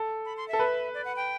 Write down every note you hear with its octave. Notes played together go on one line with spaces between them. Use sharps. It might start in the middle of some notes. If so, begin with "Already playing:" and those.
Already playing: A4
B5
C6
E5
A4
B4
D5
F#5
G5